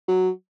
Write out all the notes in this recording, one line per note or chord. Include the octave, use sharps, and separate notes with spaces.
F#3